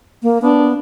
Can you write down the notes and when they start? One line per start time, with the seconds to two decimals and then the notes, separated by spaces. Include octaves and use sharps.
0.23 A#3
0.42 B3 D4